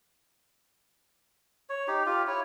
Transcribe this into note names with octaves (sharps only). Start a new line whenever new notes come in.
C#5
D#4 G4
F4 G4
E4 C#5